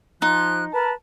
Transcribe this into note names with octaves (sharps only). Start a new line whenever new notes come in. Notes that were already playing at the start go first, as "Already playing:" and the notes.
F3 D#4 F#6
A#4 B4 A5